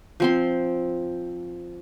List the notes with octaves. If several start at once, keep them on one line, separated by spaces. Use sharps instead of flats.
F3 C4 C6